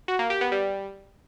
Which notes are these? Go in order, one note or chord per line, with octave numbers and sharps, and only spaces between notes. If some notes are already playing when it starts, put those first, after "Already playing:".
F#4
A#3
G4
B3
G3